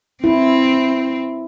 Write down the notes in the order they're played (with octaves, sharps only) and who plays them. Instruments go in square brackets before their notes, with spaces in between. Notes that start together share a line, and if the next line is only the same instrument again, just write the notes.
[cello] C4 [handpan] E4